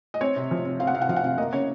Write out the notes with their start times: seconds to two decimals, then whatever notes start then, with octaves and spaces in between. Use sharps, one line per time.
0.14 D#5
0.21 C4 C#5
0.36 C3
0.51 F3
0.65 C3
0.80 C4 F5
0.87 F#5
0.94 C3 F5
1.02 F#5
1.09 F3 F5
1.16 F#5
1.23 C3 F5
1.38 A#3 D#5
1.53 C#3 C#5